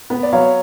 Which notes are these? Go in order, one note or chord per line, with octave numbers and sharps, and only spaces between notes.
B3
D5
F#3 C#5 F5